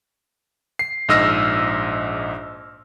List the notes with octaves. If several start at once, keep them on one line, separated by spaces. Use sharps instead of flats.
C7
A#1 G#2 D#5 E6 F6 A#6